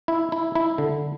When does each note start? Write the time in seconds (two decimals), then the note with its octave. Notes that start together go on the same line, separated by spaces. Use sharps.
0.08 E4
0.32 E4
0.55 E4
0.78 D3